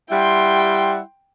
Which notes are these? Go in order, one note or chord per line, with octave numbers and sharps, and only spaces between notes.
G3 E4 F#5 G5 C6